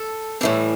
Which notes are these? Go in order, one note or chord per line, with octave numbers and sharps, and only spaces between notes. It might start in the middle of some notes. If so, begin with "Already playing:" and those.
Already playing: A4
A2 E3 G3 A4